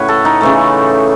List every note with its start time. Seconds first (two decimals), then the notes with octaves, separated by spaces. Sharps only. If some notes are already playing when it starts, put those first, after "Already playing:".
Already playing: A2 C#3 F#4 B4 C#5
0.08 A4
0.25 D#4
0.41 C#3 E3 A3